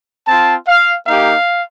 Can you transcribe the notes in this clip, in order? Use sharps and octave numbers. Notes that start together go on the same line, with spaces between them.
C4 F4 A5
F5
A#3 D#4 G4 F5